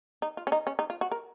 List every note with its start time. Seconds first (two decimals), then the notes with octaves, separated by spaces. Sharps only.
0.22 D#4
0.37 F4
0.47 C#4
0.52 D#4
0.67 C#4
0.79 D#4
0.90 F4
1.01 F#4
1.12 A#4